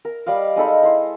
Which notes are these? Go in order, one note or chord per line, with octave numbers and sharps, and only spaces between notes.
A#4
G3 D5 D#5 F5
G#3 D#4 A4 B5
E4 C5